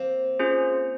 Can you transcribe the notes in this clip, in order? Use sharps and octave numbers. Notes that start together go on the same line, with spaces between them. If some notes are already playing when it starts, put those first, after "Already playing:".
Already playing: A#3 C4
C#4 F4 G#4 C5